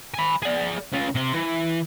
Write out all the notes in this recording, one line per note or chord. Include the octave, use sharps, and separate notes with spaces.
G#5 B5
G#4 D5
C#3 F4
C3 C6
E3